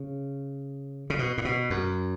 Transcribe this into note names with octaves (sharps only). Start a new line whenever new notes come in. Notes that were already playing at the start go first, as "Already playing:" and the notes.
Already playing: C#3
C#3
B2
A2
B2
F#2